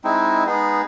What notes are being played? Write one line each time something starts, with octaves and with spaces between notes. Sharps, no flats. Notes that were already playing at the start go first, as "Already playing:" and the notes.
G#3 C4 D#4 E4
G#3 B3 D#4 G#4